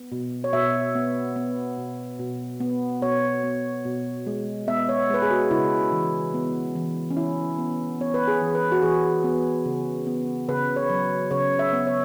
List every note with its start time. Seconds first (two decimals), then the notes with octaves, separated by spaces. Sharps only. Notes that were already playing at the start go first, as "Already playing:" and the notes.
Already playing: B3
0.12 B2
0.44 C#5
0.53 B2 E5
0.95 B3
1.36 B3
1.78 B2
2.19 B2
2.60 B3
3.02 B2 C#5
3.44 B3
3.85 B2
4.27 G#3
4.68 B3 E5
4.89 C#5
5.10 G#3 B4
5.22 G#4
5.31 F#4
5.51 C#3 E4
5.92 E3
6.34 B3
6.75 E3
7.11 C#4
7.17 E3 E4
7.59 B3
8.00 B3 C#5
8.14 B4
8.28 G#4
8.42 E3
8.55 B4
8.72 F#4
8.82 E3 G#4
9.24 B3
9.66 C#3
10.07 B3
10.49 C#3 B4
10.76 C#5
10.90 F#3
11.31 C#3 C#5
11.59 E5
11.73 B3
11.87 C#5